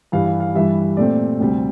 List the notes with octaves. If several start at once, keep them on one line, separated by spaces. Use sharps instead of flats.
G2 E3 G3 F5
F5
F5
G2 E3 G3 E5
A#2 A3 C4 D5
D2 C3 G3 C4